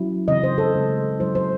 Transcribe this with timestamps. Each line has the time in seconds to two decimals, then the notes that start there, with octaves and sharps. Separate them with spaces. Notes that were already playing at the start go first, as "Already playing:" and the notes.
Already playing: F#3 C#4 E4
0.28 C#3 E3 C4 D#5
0.44 C5
0.58 A4
0.74 C#3 G#3 C#4
1.19 F#3 C#4 E4 C5
1.35 C5